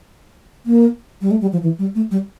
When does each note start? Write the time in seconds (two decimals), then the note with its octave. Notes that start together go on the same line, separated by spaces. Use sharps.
0.66 A#3
1.22 G3
1.31 A3
1.41 G3
1.52 F3
1.63 E3
1.79 G3
1.95 A3
2.11 G3